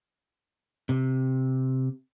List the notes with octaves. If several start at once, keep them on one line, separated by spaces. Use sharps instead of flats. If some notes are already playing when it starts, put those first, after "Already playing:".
C3